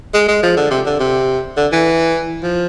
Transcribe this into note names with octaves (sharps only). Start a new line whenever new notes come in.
G#3
G#3
F3
D3
C3
D3
C3
D3
E3
F3